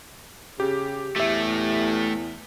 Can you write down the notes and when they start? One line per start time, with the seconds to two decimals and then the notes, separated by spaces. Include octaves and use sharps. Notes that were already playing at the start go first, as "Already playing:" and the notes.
0.60 C#3 G4
1.16 E2 A2 A3 G4 E5